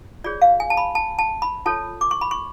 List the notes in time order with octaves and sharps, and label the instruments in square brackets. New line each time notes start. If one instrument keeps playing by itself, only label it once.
[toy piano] F4 G#4 C#5 D5
F5
G#5
A5
B5
A5
A5
B5
F4 A4 C#5 A5
D6
C#6
B5
C#6